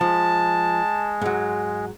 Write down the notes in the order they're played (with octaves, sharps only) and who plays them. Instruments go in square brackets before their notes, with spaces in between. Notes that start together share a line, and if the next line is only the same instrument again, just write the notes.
[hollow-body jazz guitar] F3 [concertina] G#3 [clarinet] A5
[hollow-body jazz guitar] G#2 F#3